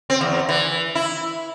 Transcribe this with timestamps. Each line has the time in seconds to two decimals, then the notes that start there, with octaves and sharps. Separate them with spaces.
0.10 C4
0.21 E2
0.49 E3
0.95 E4